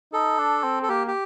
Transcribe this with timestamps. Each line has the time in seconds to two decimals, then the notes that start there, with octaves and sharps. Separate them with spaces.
0.13 D#4 A4
0.38 D4
0.64 C4
0.83 A4
0.89 A#3 G4
1.07 G4